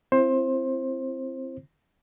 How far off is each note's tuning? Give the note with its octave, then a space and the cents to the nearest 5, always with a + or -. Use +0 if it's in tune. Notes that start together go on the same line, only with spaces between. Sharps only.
C4 +0 E4 +30 C5 +20